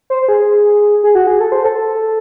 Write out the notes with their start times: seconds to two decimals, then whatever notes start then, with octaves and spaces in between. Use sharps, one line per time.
0.10 C5
0.28 G#4
1.03 G#4
1.15 F#4
1.27 G#4
1.40 A4
1.52 C5
1.64 A4